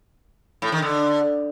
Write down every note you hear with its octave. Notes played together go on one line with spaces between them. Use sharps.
A2
D#3
D3